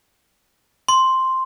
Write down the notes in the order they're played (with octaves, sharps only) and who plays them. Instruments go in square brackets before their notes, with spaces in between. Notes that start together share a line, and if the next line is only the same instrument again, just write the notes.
[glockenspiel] C6